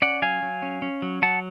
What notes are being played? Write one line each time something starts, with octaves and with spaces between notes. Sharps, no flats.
C#4 D5 F#5
F#3 F5 G#5
F#3
C#4
C#4
F#3
F#3 F#5 A5